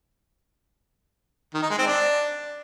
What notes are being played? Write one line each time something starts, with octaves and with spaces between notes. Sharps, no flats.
D#3
D#4
G#3
C4
D4